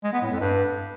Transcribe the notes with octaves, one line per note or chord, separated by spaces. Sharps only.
G#3
B3
A2
F2
G2